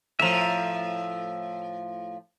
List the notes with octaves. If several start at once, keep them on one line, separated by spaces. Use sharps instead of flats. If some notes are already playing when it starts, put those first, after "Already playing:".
A2 F3 E5 A#5